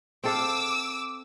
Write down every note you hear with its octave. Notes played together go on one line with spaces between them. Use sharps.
C4 A4 F5 D6 E6